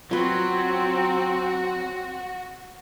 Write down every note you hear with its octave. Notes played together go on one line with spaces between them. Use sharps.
F#3 C4 F4 F#4 B4